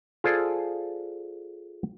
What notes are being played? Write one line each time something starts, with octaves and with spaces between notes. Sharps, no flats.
F4 G#4 A4 C5 D5